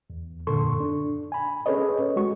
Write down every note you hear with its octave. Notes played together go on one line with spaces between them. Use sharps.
E2
F#2 A#2 D3 A4 C6 C#6
D4
G#5 B5
C#4 G#4 A4 B4 C#5 D#5
G#3 F#4 C#6